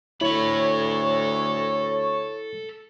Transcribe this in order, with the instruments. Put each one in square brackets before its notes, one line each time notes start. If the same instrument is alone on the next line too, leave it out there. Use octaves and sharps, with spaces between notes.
[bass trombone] D2 [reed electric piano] E4 [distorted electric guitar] A4 B5 [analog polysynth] C#5